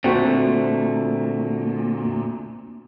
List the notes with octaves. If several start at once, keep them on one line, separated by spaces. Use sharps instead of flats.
A#2 D3 A3 C4 F#4 C5